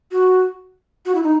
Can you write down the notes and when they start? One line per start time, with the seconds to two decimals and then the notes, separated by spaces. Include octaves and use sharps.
0.11 F#4
1.06 F#4
1.15 E4
1.23 D#4